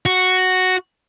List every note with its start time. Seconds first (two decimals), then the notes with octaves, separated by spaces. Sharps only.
0.06 F#4